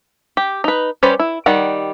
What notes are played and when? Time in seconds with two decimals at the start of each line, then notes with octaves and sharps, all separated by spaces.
0.37 G4
0.64 D#4 B4
1.03 G3 C#4 B4 C5 D5
1.19 E4
1.46 D#3 G3 D5 F#5